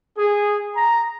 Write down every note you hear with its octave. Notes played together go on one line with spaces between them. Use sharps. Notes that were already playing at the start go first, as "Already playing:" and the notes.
G#4
A#5